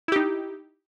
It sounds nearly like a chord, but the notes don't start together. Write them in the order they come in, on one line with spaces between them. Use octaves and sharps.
E4 G4 D#4